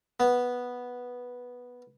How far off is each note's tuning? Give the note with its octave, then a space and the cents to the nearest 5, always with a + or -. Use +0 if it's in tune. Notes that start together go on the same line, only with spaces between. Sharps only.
B3 -5